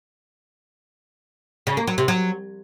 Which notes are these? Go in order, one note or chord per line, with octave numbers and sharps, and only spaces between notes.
C#3
A#3
F#3
C3
F#3